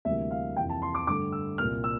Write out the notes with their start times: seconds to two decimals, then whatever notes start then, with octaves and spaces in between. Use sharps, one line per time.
0.05 D2 C3 E3 G3 A#3 E5
0.31 F5
0.56 F2 C3 E3 A#3 G5
0.69 A5
0.82 C6
0.95 D6
1.07 G2 D3 A3 D6
1.32 E6
1.58 C2 A#2 G3 A#3 F6
1.84 E6